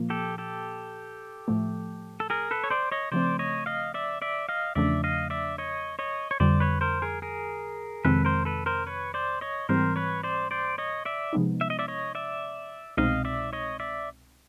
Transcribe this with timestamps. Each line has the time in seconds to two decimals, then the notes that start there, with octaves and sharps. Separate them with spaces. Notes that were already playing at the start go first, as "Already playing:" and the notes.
Already playing: A#2 F3 A#3
0.10 G4 A4
0.38 G4 A4
1.48 A2 F3 A3
2.20 A4
2.30 G#4 A#4
2.51 A4 B4
2.64 C#5
2.70 C5 D5
2.92 C#5 D#5
3.12 C#3 F3 A3 C4 C5 D5
3.39 C#5 D#5
3.66 D#5 F5
3.94 D5 E5
4.22 D5 E5
4.49 D#5 F5
4.75 E2 C#3 F3 A3 D4 D5 E5
5.04 D#5 F5
5.30 D5 E5
5.58 C#5 D#5
5.99 C#5 D#5
6.31 C#5
6.40 F2 D3 G3 C5 D5
6.60 B4 C#5
6.81 A#4 C5
7.02 G#4 A#4
7.22 G#4 A#4
8.05 F2 C3 D#3 G#3 C4 A4 B4
8.25 A#4 C5
8.45 A4 B4
8.66 A#4 C5
8.87 B4 C#5
9.14 C5 D5
9.41 C#5 D#5
9.69 G#2 E3 G3 C4 A#4 C5
9.96 B4 C#5
10.23 C5 D5
10.51 C5 D5
10.78 C#5 D#5
11.05 D5 E5
11.33 C3 F3 G#3 B3 D#4
11.61 E5
11.70 D#5
11.79 D5 E5
11.88 C#5 D#5
12.15 D5 E5
12.97 C2 B2 G#3 C4 D#4 D#5 F5
13.25 D5 E5
13.53 C#5 D#5
13.80 D5 E5